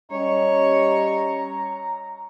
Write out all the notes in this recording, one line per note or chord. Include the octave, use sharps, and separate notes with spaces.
G3 C#4 C#5 D#5 A#5